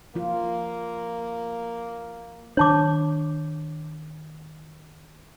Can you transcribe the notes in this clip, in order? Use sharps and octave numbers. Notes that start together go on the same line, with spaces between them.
F3 A#3 F4
D#3 D4 C#5 A5 D6